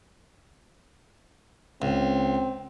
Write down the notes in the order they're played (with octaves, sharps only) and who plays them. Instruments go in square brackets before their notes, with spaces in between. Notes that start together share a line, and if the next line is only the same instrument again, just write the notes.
[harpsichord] C#2 [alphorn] C4